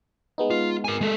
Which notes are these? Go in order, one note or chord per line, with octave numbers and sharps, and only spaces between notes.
G#3 B3 D#4
F4
A#4 G#5
G#3 A4